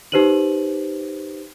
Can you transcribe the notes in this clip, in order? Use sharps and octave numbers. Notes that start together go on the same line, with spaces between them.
D#4 G4 B4 C5 D#7 F#7